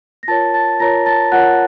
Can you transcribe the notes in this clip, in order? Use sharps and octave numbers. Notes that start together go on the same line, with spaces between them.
A#6
F4 A#4 C#5 A5 A6
A5 A6
F4 A#4 C#5 A#5 A#6
A5 A6
F4 A#4 C#5 F#5 F#6